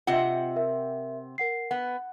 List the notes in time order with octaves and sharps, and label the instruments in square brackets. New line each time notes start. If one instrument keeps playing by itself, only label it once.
[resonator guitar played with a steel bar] C3 C4 F#5 [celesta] F4 D#5 E5
[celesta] A#4 E5
A#4 F#5 C7
[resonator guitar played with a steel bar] B3 [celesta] F#5